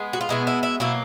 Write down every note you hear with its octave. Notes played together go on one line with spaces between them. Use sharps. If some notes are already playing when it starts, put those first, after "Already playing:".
Already playing: G#3 B3
F#4
F4
B2 G#3 B3 E4
E4
E4
B2 F#3 A#3 E4